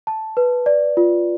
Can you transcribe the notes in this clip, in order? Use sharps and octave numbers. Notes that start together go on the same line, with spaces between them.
A5
B4
D5
F4